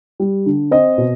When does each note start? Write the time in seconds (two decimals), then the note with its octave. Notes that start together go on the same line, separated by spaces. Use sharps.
0.20 G3
0.46 D3
0.71 C4 D#5
0.98 B2